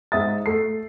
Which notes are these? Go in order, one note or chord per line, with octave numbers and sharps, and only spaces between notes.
G#2 G#4 E5 D#6 A6
A3 C7